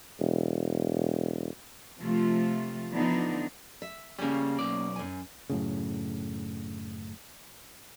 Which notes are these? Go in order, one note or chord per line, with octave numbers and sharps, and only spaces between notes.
E1
C3 F3 A3 F4
D3 E3 F3 B3 D4 D#4
E5
C#3 G3 A#3 C#4
B1 D5
F#2 G#5
F#2 A2 C#3